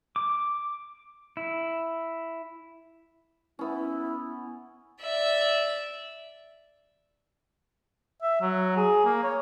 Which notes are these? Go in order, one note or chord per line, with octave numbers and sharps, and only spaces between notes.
D6
E4
B3 C#4 E4
D5 E5
E5
F#3
G#4
A#3
C#5